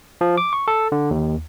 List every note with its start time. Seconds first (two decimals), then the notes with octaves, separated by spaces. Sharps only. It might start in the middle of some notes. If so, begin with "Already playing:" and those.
0.21 F3
0.38 D6
0.53 C#6
0.68 A4
0.92 D3
1.11 D#2